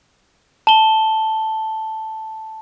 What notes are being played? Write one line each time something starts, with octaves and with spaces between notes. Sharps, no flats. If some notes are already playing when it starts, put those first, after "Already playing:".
A5 G7